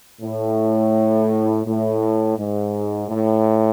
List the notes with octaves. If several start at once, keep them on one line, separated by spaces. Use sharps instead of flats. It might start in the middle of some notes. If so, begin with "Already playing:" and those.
A2
A2
G#2
A2